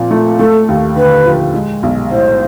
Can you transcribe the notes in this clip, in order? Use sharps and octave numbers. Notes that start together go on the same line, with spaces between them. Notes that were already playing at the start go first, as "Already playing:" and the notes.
Already playing: A#2 F3 C4
A3
A3 A4
D#2
D3 B4
F3
G#3
B1
A2 C5